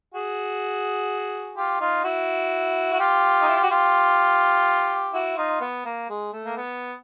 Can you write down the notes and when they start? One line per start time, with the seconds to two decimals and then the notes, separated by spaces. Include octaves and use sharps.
0.14 F#4 G#4
1.56 F4 G4
1.80 D#4 F4
2.04 E4 F#4
2.93 F#4
3.00 F4 G4
3.41 D#4
3.49 E4
3.56 F4
3.63 F#4
3.70 F4 G4
5.14 E4 F#4
5.37 D#4 F4
5.61 B3
5.85 A#3
6.10 G#3
6.33 A3
6.45 A#3
6.57 B3